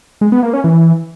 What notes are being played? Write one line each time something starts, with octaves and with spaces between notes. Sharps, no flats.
G#3
B3
A#3
C#4
E3